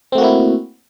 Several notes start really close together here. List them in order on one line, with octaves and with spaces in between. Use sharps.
C4 A3 F#4 A#3 E4